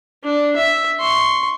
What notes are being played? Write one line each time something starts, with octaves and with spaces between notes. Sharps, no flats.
D4
E5
C6 C#6